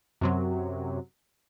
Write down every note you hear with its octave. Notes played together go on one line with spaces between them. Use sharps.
F#2 C3 F#3